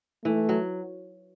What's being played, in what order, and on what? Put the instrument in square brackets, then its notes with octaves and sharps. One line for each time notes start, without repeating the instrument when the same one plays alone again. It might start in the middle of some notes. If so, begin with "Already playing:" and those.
[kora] E3 [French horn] A3
[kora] F#3